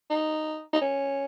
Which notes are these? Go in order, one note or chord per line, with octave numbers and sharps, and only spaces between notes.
D#4
D#4
C#4